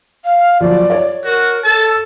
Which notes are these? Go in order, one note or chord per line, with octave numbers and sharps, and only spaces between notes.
F5
F3 F#3 D5
C#5
F#4 A#4
A4 A5